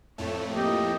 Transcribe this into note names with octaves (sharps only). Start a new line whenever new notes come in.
F2 A2 A3 A4 C#5
A#3 G4 D#5